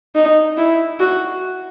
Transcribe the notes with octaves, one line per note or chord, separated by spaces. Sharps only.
D#4
E4
F#4